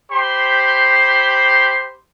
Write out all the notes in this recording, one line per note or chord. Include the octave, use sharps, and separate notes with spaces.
G4 C5 B5 C6